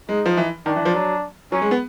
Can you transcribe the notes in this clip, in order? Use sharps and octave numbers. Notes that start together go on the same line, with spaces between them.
G#3 D#4
F3
E3
D#3 D4
E3
F3
F#3
F#3 C#4
G#3
B3